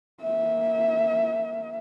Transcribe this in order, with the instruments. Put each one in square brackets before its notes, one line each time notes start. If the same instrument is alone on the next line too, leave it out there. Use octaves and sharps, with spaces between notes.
[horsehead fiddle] A#3 E5